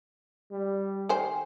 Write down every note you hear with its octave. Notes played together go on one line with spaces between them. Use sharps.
G3
D#3 C5 G5 G#5